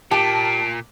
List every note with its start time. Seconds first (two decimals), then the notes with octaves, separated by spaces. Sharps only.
0.11 A#2 G4 A5 D7